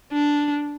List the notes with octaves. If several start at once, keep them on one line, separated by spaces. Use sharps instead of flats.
D4